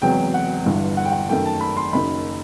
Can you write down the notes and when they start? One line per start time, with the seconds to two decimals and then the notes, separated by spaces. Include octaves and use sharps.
0.02 E1 E2 C3 F#3 B3 G5
0.34 F#5
0.66 G1 G2 E3
0.97 F#5
1.05 G5
1.12 F#5
1.29 F#2 D#3 A3 G5
1.45 A5
1.61 B5
1.77 C6
1.93 F#1 F#2 D#3 B5